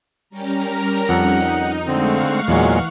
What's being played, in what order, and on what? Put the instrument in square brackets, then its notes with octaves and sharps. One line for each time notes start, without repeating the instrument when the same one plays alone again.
[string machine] G3 C#4 G4 [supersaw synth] A#4 A#5
[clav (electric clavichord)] F2 A4 [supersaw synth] D#4 [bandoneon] F#5
[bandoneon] D3 C4 [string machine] G#3 A3 [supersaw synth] F5 F#5 C#6
[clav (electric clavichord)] E2 [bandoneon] A#2 F#3 G#3 [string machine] E3